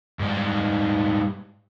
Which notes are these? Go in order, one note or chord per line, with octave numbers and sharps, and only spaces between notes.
G#2 G3